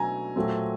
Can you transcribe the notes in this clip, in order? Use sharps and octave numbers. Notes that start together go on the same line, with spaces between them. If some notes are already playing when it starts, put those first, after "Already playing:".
Already playing: B2 F#3 A3 D4 G#5 A#5
A#2 F#3 A3 C4